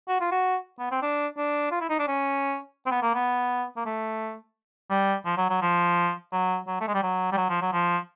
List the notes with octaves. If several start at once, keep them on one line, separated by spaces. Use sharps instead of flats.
F#4
F4
F#4
B3
C4
D4
D4
F4
E4
D#4
D4
C#4
C4
B3
A#3
B3
A#3
A3
G3
F3
F#3
F#3
F3
F#3
F#3
A3
G#3
G3
F#3
G3
F#3
F3
F#3
F3